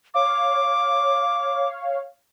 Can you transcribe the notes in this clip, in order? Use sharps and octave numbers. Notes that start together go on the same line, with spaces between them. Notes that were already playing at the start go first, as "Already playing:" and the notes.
C#5 F5 D6